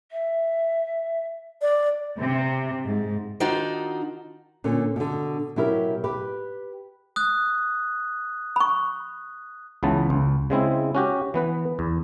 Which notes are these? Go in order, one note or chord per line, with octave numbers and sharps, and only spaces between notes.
E5
D5
C3
G#2
D#3 D4 D#4 F4 F#4
A#2 D3 C#4
B2 D3
B2 F#3 E4 G4 A#4
G4 B4
D#6 F#6
B5 C#6
C#2 C#3 E3 B3 A5
C#2
C#3 G#3 C4 E4
C#4 F#4 G4
E3 B3 B4
E2